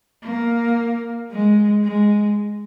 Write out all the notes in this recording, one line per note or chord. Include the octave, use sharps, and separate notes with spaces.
A#3
G#3
G#3